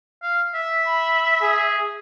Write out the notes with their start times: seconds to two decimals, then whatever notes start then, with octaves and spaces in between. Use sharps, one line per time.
0.22 F5
0.54 E5
0.87 B5
1.42 G#4